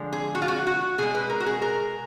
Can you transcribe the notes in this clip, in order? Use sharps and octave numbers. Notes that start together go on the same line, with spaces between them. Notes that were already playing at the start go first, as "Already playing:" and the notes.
Already playing: D3 F3 G#3
G#4
F#4
F4
F#4
F#4
B2 G#3 G#4
B4
A#4
F#4
G#4
A#4